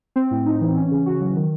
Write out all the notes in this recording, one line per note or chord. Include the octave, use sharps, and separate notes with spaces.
C4
A2
D#4
E3
C#4
C#3
F#4
F#3
D#3